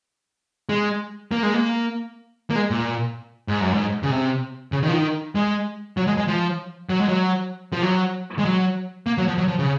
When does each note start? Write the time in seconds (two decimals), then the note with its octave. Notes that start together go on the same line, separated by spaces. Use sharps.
0.69 G#3
1.32 A#3
1.43 G#3
1.54 A#3
2.50 A#3
2.56 G#3
2.71 A#2
3.48 G#2
3.61 F#2
3.74 G#2
4.03 C#3
4.11 C3
4.72 C#3
4.83 D#3
4.89 F3
4.93 D#3
5.35 G#3
5.97 F#3
6.07 G#3
6.18 G#3
6.28 F3
6.90 F#3
7.00 G#3
7.09 F#3
7.73 F3
7.83 F#3
8.39 G#3
8.45 F#3
9.07 A#3
9.18 F#3
9.28 F3
9.38 F#3
9.48 F3
9.59 C#3